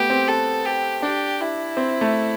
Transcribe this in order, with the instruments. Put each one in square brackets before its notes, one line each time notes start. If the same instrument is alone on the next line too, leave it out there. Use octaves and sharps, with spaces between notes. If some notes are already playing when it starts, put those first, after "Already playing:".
Already playing: [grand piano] A3 B3 [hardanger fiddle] G4
[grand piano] C4
[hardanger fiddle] A4
G4
[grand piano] D4 [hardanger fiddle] G4
[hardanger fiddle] E4
[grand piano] C4
A3